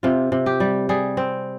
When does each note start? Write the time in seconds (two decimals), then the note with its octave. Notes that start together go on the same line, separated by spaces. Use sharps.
0.03 C3 F4
0.32 C3
0.46 G4
0.60 G3
0.89 G3 G#4
1.17 C4